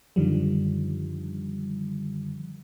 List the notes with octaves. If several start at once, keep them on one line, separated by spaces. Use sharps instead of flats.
F#2 D3 D#3 F3 G3